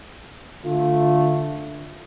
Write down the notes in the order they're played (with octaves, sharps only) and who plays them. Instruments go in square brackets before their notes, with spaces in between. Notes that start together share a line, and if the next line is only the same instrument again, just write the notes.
[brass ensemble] D3 A3 F4